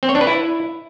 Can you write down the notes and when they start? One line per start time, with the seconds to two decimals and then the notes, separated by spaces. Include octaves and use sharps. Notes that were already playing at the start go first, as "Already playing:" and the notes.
0.03 C4
0.09 C#5
0.15 D4
0.21 B4
0.27 E4